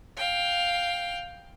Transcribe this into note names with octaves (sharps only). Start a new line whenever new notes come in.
F5 G5